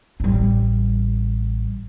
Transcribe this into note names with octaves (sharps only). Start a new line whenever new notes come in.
A1 G3